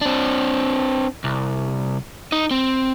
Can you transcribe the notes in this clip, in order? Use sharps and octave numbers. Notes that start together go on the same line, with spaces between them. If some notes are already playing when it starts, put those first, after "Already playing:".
C4 D4
C2
D#4 D#5
C4